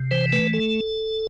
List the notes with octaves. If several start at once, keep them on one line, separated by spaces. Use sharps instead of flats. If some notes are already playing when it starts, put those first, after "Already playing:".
Already playing: C3
E3 C5
A3 B4
A4